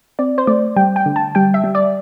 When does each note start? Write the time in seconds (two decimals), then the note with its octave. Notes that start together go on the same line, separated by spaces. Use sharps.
0.19 C4 D5
0.38 C5
0.47 A3 D5
0.76 G3 G5
0.96 G5
1.06 D3
1.16 A5
1.35 G3 G5
1.54 E5
1.64 G3
1.75 D5